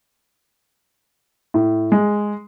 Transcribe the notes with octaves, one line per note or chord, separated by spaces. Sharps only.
A2
G#3